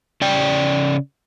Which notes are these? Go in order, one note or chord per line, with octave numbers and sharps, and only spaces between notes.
C#3 D5 G5